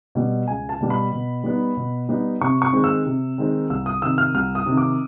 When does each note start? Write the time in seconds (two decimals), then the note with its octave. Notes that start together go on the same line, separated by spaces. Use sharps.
0.15 B2 G3
0.48 C#2 G#5
0.69 A5
0.80 B2 G3
0.90 B5
1.12 B2
1.44 G3 B3 D#4
1.77 B2
2.09 G3 B3 D#4
2.41 C3 C#6
2.62 C#6
2.73 D#3 G#3 C4 D#4
2.84 E6
3.06 C3
3.38 D#3 G#3 C4 D#4
3.70 C2 E6
3.86 D#6
4.02 C3 D#3 E6
4.18 F6
4.34 C2 F6
4.55 D#6
4.66 C3 D#3
4.77 D6